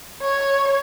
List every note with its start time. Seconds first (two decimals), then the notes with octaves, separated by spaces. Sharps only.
0.21 C#5